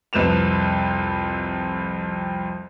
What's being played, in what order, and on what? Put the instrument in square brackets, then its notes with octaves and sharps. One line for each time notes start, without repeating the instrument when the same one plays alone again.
[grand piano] C2 F2 B4 E7 F7